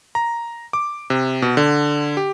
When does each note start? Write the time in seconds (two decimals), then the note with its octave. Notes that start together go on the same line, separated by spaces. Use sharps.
0.15 A#5
0.73 D6
1.10 C3
1.42 B2
1.57 D3
2.17 G4